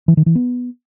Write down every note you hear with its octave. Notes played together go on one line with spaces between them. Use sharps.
E3
D#3
E3
B3